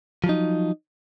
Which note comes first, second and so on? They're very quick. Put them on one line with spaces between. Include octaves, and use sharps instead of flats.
F3 F#3 D#4